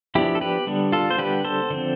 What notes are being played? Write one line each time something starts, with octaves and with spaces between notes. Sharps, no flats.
F3 B3 D4 E4 G4
A4
G4 B4
D3 G3 B3 D4
F4 A4
C5
D3 G3 B3 D4 G4 B4
A4 C5
D3 F3 C4